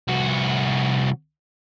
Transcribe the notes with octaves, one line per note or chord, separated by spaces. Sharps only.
C2 F#4